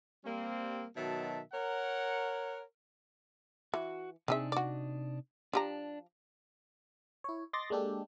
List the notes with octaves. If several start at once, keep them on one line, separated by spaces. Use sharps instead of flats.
G3 A#3 C4
B2 D#3 F#3 E5 A5
A#4 C#5 F#5
E3 F#4
C3 C4 D4 D#4 G#4 E5
F#4 D5
F3 D4 G4 A#5
E4 C#5
D#5 C6 D6 A6 A#6
G#3 A#3 D4 G4 A4